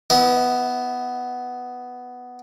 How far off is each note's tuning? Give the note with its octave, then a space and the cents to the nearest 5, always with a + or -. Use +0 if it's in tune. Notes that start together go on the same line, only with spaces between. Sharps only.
B3 +5 E4 -25 E5 -45